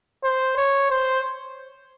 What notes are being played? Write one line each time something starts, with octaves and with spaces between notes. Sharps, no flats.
C5
C#5
C5